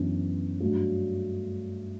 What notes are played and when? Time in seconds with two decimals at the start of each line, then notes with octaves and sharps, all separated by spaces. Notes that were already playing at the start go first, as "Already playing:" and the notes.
Already playing: F#2 E3 B3 D4
0.60 G2 F#3 A3